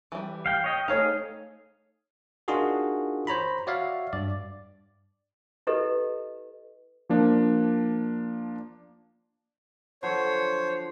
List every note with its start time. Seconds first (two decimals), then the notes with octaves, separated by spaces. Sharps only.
0.12 E3 G3
0.46 F5 G5
0.64 C#5 D#5 G5
0.88 A3 D#4 G#4 A4 C#5 F5
2.48 D4 D#4 F4 F#4 G#4 A#4
3.27 C5 C#5 A#5 B5
3.67 F#4 C#5 D5 E5 F5
4.13 G2 D5
5.67 E4 G4 A4 B4 D#5
7.09 F3 A#3 D4
10.03 D3 F3 F#3 C5 C#5